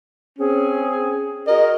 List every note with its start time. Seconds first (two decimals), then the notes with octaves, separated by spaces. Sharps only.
0.39 C4 C#4 G#4
1.47 F#4 G#4 A#4 D#5